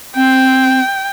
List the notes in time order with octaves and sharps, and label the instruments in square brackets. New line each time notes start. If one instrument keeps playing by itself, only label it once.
[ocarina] C4 [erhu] G5